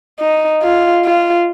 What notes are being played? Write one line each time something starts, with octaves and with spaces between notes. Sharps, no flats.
D#4
F4
F4